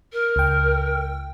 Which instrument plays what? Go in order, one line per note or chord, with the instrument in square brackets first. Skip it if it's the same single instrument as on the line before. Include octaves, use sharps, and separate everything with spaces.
[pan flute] A#4
[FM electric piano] C#2 G5